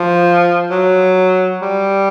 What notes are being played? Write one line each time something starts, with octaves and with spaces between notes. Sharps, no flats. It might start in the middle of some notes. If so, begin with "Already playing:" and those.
Already playing: F3
F#3
G3